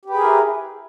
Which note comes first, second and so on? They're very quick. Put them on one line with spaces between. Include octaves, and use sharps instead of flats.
G4 B4 G#4 A#4 E4